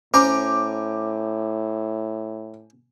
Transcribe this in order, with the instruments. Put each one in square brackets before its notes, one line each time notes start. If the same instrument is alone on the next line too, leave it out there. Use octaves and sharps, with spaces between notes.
[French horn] A2 [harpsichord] C#4 C5 A#5 [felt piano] D6